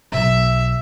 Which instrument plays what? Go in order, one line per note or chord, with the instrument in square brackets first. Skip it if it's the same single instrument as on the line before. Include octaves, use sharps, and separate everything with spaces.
[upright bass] B1 [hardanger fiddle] E5